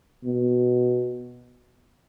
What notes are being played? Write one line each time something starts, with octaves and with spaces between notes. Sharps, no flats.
B2